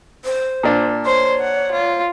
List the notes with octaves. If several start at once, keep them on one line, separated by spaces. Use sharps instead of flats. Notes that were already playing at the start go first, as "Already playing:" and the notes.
C5
A#2 D4
C5 C#5
F#5
F4